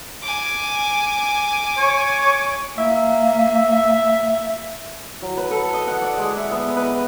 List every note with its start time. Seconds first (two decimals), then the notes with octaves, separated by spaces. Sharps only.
0.22 G#5 D6
1.78 C#5
2.78 A#3 E5
5.22 F#3
5.37 B4
5.50 A4
5.73 D#5
5.87 F#5
6.02 D5
6.18 G#3
6.37 E5
6.51 B3
6.77 B4
6.92 D#5